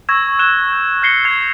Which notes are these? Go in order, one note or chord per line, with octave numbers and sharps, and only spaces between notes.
C#6 E6 G#6 A#6 E7
F#6 E7 G7
G6
F6 G6 A#6 C7 C#7 G7
F6 G#6 C7 F7